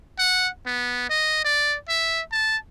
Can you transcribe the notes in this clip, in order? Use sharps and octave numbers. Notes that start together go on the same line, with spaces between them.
F#5
B3
D#5
D5
E5
A5